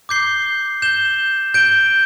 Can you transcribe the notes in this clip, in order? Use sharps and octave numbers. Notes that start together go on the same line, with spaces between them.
D6 G6 C7 G7
G6 E7 G7
G6 D7 G7